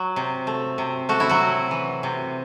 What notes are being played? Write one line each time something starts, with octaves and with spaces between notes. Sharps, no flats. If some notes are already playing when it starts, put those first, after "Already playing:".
Already playing: F#3
C3
A3
C3
A3 F#4
E4
F#3 F#4
C3
E3
C3